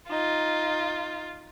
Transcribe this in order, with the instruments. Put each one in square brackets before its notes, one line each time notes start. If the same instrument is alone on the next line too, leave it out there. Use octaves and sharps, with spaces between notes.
[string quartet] D#4 [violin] F4